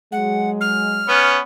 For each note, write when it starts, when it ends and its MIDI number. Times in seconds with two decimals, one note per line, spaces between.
0.12 1.10 54
0.12 1.10 56
0.12 0.50 78
0.61 1.32 89
1.08 1.38 59
1.08 1.38 61